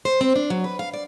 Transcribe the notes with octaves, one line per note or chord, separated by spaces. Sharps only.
C5
C4
D4
F#3
B4
F5
D5